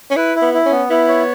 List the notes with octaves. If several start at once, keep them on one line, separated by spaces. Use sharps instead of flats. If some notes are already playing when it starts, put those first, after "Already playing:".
C#4
E4 B4
E4
B3
E4
C#4
B3
B3 E4
C#5